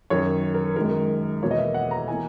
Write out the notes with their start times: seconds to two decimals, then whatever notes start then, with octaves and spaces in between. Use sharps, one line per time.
0.10 F#2 D#3 F#3 C#5
0.54 A#4
0.76 F#2 D#3 G#3 A#4
1.41 E2 B2 A#3 C#5
1.51 D#5
1.58 E5
1.74 F#5
1.91 A#5
2.08 E3 A#3 G#5